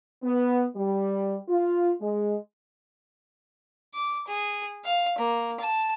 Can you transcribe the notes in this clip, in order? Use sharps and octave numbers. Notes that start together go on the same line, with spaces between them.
B3
G3
F4
G#3
D6
G#4
F5
A#3
A5